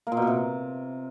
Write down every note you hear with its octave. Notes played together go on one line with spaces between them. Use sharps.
A#3
A#2
B2
A#2
C3